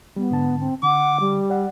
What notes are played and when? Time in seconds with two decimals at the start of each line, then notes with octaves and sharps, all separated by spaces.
0.16 G3 B3
0.30 G#2 D3 A5
0.60 C4
0.83 D3 F#5 D6
1.20 G3
1.50 D5 F#5